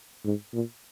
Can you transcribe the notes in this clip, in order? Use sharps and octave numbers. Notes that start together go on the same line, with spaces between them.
G#2
A#2